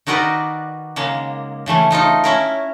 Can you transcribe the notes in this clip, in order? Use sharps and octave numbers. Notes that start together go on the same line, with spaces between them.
D#3 D#4 F#4 A#4 B4 D5
C#3 G#3 A#3
C#3 E3 A3 C#4
A3 D#4 F4 D#5
C#4 E4 A#4